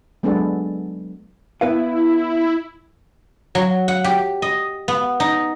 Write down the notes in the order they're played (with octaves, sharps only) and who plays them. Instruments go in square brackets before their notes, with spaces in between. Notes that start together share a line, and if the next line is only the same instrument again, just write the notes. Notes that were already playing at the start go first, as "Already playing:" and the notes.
[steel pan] F#3 G#3 B3 D4 A4
[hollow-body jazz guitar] B3 B4 F5 [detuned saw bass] E4
[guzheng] F#3
F#5
G4
D#5
B3
D#4